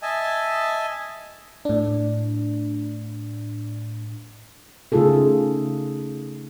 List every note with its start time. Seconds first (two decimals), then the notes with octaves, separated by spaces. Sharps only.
0.02 D#5 E5 G#5 A5
1.65 A2 D4
4.92 C#3 A3 D#4 F4 G#4 A4